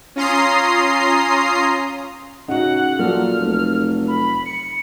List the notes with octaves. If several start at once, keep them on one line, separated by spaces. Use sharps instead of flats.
C#4 F4 A#5 C6 D#6 C7
C#3 D#4 F#4 F#5
A#2 F3 F#3 A4 F6
F1
B5
C#7